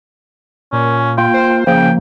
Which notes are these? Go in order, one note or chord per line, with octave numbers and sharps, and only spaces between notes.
A#2 C#4
A#3 F4 G5
C5
C#3 F3 A#3 G5